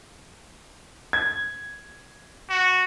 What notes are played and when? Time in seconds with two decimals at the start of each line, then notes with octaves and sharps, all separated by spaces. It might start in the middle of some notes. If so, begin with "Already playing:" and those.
1.13 G#6
2.49 F#4